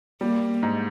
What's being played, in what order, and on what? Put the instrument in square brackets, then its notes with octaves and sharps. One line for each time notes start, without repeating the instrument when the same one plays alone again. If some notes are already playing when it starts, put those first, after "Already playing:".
[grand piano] G3 [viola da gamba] A#3
[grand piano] G#2